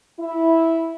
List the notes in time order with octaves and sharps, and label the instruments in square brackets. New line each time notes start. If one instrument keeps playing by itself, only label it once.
[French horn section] E4